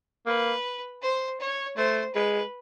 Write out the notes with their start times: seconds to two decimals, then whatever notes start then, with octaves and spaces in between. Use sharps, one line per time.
0.26 A#3 B4
1.02 C5
1.40 C#5
1.77 A3 C5
2.14 G#3 B4